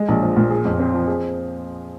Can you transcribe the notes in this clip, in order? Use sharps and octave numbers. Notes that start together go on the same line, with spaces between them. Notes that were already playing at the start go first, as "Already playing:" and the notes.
Already playing: G#3
A#1
F3
A#2
G#4
F2
C4
F3
G#4